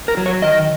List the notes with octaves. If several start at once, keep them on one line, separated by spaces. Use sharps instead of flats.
A#4
F#3
C#5
D#3 D#5